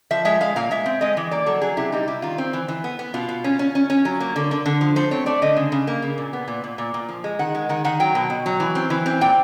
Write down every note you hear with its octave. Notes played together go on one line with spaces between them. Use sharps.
F3 E5
G#3 E5
G#3 F5
A#2 F5
G#3 E5
C4
G#3 D#5
E3
A#3 D5
F#3 A4
F#3 G#4
C3 E4
G3 D#4
G3 E4
D#3 F4
C4
E3
E3
B3
B3
B2 F4
B2
C#4
C#4
C#4
C#4
F#3
A#3
D3
D3
D3
F3
A3 C5
C4 C#5
A3 D5
D3 D#5
C#3
C#3
A#3
C#3
A#2
B3
A#2
A#2
A#2
A#2
F3
G#3
D#3 F#5
G#3
D#3 F#5
D#3 F#5
F#3 G5
B2
B2
F#3
E3
C4
E3
C4
A#2 G5